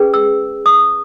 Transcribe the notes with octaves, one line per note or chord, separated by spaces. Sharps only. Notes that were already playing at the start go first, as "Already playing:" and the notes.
Already playing: C#4 G#4 B4
E6
D#6